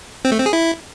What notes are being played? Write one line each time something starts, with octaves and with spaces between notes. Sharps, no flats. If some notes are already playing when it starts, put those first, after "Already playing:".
C4
A3
C4
G#4
E4